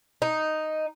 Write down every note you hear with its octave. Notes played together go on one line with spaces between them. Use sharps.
D#4